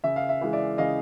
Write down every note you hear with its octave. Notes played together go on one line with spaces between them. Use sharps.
C#3 E5
F5
E5
E3 G#3 F5
D5 E5
C#3 D#5 F5